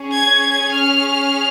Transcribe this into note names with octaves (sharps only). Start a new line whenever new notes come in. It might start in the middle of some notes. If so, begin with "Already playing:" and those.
Already playing: C#4 G#4
G#6
G#6
F6